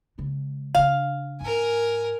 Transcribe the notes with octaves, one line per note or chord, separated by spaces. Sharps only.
C#3 G#3
C#3 D4 F5
G#2 A#4 G#5